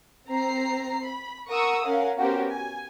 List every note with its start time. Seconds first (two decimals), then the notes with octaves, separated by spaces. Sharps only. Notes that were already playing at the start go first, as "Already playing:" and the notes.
0.28 C4 A#5 C7
1.04 B5
1.49 A#4 F#5 A#5 C#6 D#6 E6
1.84 C#4 A#4 F5 F#5
2.17 B3 C#4 F#4 G4 A#4 C5
2.51 G#5